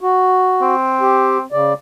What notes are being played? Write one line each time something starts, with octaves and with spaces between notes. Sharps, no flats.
F#4
C4
G4
C#3 D5